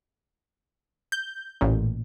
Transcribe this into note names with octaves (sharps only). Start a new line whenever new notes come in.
G6
A1 A#2